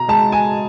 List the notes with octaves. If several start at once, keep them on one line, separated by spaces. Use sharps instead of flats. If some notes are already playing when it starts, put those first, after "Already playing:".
Already playing: B2 A#5
G#3 A5
G#5